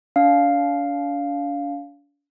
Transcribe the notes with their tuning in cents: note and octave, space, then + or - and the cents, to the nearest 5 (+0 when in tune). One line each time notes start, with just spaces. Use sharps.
D4 -40 F5 +0